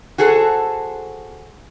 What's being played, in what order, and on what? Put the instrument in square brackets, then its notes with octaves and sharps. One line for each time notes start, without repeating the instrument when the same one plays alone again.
[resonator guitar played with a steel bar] F#4 G#4 A4 C5